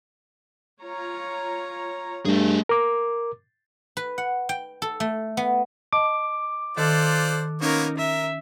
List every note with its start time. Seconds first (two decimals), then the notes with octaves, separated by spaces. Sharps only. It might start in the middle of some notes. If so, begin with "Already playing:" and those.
0.80 F4 C#5 A#5
2.26 G2 A3 G#4
2.69 A#4 D6
3.97 B4
4.18 F#5
4.49 G5
4.82 A4
5.00 A3
5.37 B3
5.93 D#5 A5 D6
6.77 D#3 F4 A4 C5 D5 F#6
7.62 A#3 B3 C#4 D#4 A#4 C#5
7.98 A#4 E5